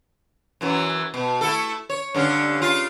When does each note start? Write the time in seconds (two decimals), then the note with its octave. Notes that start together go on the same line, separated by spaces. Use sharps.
0.61 F#2 E3 F#3
1.14 B2
1.41 A3 E4 A4
1.90 C#5
2.14 G2 D3 C#4
2.62 C#3 F4